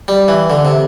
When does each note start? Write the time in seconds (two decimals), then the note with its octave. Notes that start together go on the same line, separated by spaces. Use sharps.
0.08 G3
0.28 E3
0.50 D3
0.65 C3